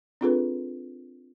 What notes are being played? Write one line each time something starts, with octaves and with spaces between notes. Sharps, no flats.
C4 D4 F4 G#4 A4 B4